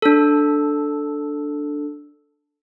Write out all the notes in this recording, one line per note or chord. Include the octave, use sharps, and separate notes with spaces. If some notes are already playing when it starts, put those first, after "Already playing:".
D4 A4